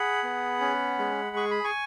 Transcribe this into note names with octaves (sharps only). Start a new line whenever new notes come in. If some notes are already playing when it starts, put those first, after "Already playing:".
Already playing: G#4 F#5 B5
B3
C#4
G#3
G#4 C#6
B5
G#5 C#6